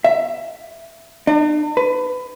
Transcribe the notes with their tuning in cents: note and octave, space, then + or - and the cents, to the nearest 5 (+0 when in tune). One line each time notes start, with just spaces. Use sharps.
E5 +15
D4 +45
B4 +25